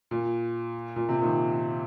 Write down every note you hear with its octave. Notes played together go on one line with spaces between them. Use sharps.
A#2
A#2
C3
A#2 D#3